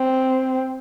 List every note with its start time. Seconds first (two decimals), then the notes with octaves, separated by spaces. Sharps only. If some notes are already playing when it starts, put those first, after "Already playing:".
Already playing: C4